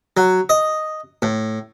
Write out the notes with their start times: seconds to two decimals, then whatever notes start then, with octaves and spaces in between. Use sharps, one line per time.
0.17 F#3
0.49 D#5
1.22 A2